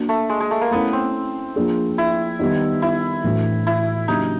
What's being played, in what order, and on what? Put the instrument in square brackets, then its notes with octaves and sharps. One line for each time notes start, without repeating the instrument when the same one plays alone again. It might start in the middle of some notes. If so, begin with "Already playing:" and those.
Already playing: [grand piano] A#3 D4 F#4
[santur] A3
G#3
G#3
A3
A#3
[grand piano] A3 C#4 E4 [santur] B3
[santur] C4
[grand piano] F3 A#3 D4 F4 G#4
[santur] E4
[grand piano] D#3 G3 B3 D#4
[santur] E4
[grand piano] A2 E3 A3 D4 F#4
[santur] E4
[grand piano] C#3 F#3 A#3 D4 G4 [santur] D#4